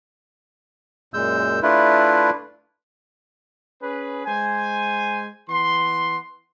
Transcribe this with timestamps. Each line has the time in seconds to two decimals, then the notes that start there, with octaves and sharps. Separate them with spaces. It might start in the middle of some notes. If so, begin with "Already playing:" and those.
1.14 F#2 A#2 G#3 E6 G6
1.63 A3 D4 E4 F4 B4
3.81 C#4 G#4 B4
4.25 G#3 C5 G#5
5.49 E3 B3 C6